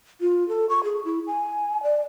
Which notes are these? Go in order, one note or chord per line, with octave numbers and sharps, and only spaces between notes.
F4
A4
C#6
G#4
E4
G#5
D5